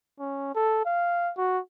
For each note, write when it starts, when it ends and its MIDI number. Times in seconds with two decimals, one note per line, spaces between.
0.20 0.55 61
0.55 0.81 69
0.85 1.32 77
1.37 1.59 66